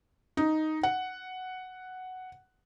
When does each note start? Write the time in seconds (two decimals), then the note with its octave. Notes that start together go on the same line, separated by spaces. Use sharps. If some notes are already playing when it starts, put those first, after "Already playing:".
0.37 D#4
0.83 F#5